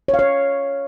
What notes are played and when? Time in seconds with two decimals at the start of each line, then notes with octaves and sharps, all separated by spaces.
0.08 C#5
0.14 F5
0.19 C#5